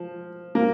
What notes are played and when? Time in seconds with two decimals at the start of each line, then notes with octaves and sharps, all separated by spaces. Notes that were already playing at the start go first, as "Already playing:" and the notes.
Already playing: F3
0.55 A#3